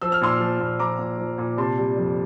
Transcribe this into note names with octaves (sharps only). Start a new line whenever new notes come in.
F3 E6
F6
A#2 C6 E6
F3
A#2
F3 A#5 D6
A#2
F3
A#2
C3 A5 C6
G3
F2